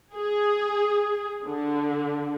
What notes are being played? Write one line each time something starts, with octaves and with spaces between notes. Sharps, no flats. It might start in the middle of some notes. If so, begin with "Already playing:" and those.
G#4
D3